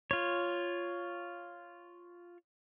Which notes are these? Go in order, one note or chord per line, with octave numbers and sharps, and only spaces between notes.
F4 C#5